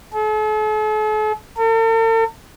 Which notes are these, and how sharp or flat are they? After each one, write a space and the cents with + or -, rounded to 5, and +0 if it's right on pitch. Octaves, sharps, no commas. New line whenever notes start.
A4 -45
A4 +45